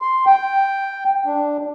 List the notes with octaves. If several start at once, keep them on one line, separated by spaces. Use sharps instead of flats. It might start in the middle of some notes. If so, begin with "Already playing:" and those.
C6
G5
D4